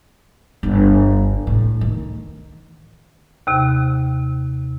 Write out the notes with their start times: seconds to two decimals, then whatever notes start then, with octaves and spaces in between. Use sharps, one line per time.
0.63 G1
1.47 A2
1.81 D#3
3.47 D#2 C3